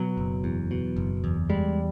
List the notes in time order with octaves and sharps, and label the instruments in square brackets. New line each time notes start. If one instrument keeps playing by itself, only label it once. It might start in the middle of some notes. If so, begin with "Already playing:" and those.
Already playing: [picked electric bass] B2 [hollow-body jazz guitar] F#3
[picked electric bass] F#1
E2
B2
F#1
E2
[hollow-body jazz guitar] G3 [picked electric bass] G#3